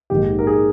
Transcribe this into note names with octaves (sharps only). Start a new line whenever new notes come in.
A#1 G#2 D#3 G4
A#4
G#4